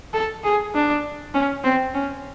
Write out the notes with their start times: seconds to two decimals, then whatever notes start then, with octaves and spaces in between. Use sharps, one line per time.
0.14 A4
0.44 G#4
0.75 D4
1.34 C#4
1.64 C4
1.94 C#4